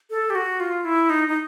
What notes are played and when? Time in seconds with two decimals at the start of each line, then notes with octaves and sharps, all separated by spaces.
0.10 A4
0.30 G4
0.35 F#4
0.60 F4
0.85 E4
1.10 D#4
1.28 D#4